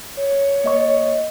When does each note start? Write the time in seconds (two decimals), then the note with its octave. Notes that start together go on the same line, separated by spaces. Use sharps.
0.17 C#5
0.64 A#3 D#5 C#6